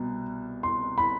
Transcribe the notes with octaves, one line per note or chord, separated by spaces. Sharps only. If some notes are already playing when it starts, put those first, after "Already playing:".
Already playing: C2 B2
C6
B5